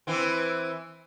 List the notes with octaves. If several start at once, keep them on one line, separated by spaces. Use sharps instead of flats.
E3 C4